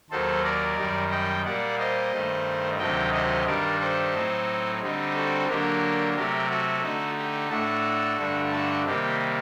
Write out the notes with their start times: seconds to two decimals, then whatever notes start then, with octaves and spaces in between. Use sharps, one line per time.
0.11 D#2 D#3 F#3 A4 C5
0.44 A#4 D5
0.78 F#2 D#3 G3
1.11 D#5 G5
1.44 A#2 G3 A#3 D5 F#5
1.78 C5 D#5
2.13 G2 D#3 A3
2.79 D2 C3 D#3 F#3 D#5 G5
3.14 C5 D#5
3.46 G2 D#3 G3 D4 A#4 D5
3.80 A4 C5
4.14 A2 F#3 C4 D#4
4.81 D3 G3 C4 D#4
5.14 F#4 A4
5.48 D3 F#3 A#3 D4 G4 A#4
6.15 C3 F#3 A3 G4 A#4
6.50 F#4 A4
6.83 D3 A3 D#4
7.17 G4
7.50 A2 A3 D4 F#4 A4
8.18 G2 D3 A3 D4
8.52 F#4 A4
8.84 C3 D#3 G3 A#3 G4